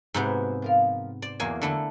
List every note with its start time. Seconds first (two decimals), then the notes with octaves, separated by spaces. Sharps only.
0.14 G#2 C3 G#3 A#3 B3 F#4
0.62 F3 A#4 F5
1.22 C5 D5
1.40 E2 C3 F#3 A#3 G#5
1.62 D3 A3 E4